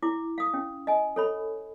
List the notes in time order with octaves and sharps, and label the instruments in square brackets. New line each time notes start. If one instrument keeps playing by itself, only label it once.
[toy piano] E4 D6
F5 D#6
C#4
D#5 G#5
A4 C#5 B5